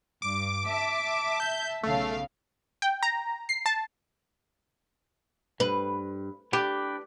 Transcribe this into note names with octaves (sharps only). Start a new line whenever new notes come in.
G2 D6
E5 A5
G6
B1 C#3 A3 F5
G5
A#5
C7
A5
G2 B4
D4 G4 B4 G5